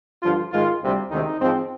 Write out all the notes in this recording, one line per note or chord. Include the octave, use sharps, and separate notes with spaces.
G2 D3 F3 F4
G#2 D#3 G#3 F4
D2 C3 G3 C4
D2 C3 D#3 G#3 C4 D#4
G#2 F3 G#3 C4